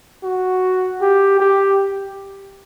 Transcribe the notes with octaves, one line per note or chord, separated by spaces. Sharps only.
F#4
G4
G4